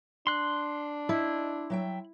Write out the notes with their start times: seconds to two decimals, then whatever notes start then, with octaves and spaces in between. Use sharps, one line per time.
0.27 D4 C6 F#6
1.09 E4 D#5
1.70 F#3 E5 G5